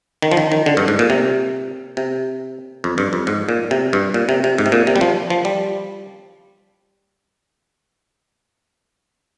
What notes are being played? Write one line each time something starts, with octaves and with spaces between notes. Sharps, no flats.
D#3
F3
D#3
D#3
D3
G2
G#2
A#2
C3
C3
F2
G2
F2
G#2
A#2
C3
G2
A#2
C3
C3
G#2
C3
A#2
C3
G3
F3
F3
G3